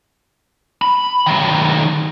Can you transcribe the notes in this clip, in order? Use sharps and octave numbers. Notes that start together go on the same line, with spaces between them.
B5
D#3 F#3